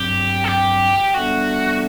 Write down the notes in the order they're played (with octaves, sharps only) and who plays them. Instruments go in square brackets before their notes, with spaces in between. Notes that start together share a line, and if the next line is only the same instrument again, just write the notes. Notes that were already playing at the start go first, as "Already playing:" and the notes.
Already playing: [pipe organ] G2 F#3 C4 [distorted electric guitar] G4
[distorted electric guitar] A4
G4
[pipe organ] G3 B3 D4 A4 E5 [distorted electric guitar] F#4